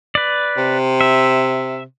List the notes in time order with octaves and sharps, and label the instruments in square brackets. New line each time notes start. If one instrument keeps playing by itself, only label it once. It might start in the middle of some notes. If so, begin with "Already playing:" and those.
[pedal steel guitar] B4 D5
[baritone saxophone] C3
[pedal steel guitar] E5